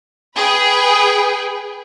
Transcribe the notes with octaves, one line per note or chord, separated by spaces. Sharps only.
G#4 B4 G5